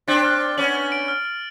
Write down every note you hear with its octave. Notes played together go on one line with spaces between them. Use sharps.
C4 D4 A6
F6
A6
B3 C#4 F#7
F6
D7
F6
F6